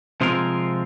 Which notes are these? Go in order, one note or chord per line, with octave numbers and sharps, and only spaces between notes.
C3 F3 G#3 C4 F4 A#4